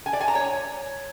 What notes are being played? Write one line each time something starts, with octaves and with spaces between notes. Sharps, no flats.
G#5
D5
G#5
A#5
C#5